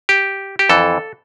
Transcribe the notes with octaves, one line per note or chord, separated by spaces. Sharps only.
G4
G4
F2 E3 A4